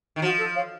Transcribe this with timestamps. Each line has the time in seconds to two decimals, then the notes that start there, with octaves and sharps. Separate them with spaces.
0.16 D#3
0.22 F3 F#4
0.38 A4
0.55 C#5 F5